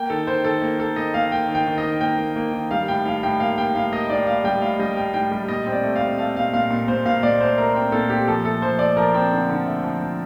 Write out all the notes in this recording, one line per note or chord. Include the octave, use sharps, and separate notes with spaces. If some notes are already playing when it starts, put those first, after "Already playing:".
Already playing: A#3 G5
D#3 A4
D#3 C5
D#3 A4
A#3
A#3 A4
A#3 D#5
A#3 F5
A#3 G5
D#3
G5
D#3
D#5
D#3
A#3 G5
A#3
A#3
D#3
G3 F5
A2 G5
A2 F5
A2 G5
A#3 F5
A#3 G5
A2 F5
A#3 D#5
A2 D5
A2 F5
G3 G5
A2 F5
G3 D#5
A2 G5
A2 G5
G3
A#2 D#5
C4
D5
A3
F5
C4
A3 F5
A#2 F5
A#2 F5
A#2
A#2 C5
A#2 F5
A#2 D5
A3 C5
A3 A#4
C4
A#2 A4
A#2 G4
F3 A4
A3 A4
F3 C5
A3 D5
F3 A#4
C4
D3
D3
A3
F3
F3